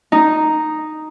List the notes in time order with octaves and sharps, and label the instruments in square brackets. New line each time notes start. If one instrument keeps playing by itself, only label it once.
[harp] D#4